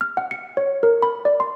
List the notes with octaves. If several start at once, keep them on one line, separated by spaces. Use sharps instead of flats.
F6
F#5
C#7
C#5
A#4
B5
D5
C6